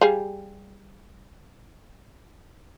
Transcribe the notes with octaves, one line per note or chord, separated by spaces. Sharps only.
G3 G#4 F5